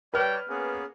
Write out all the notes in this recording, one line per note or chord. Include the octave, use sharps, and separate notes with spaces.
G3 B4 C#5 D5 G5 A5 F6
A#3 B3 C#4 G#4